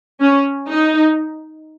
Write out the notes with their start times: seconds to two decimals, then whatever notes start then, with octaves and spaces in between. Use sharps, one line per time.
0.21 C#4
0.70 D#4